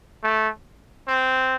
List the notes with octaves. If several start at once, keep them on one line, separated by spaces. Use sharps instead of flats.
A3
C4